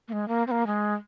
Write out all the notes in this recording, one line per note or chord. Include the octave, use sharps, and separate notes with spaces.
A#3
G#3
A#3
C4
A#3
G#3